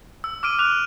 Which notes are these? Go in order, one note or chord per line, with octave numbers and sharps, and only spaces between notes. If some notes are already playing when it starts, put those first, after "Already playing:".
E6
D6 F6 D7 D#7
D6 F#6 F7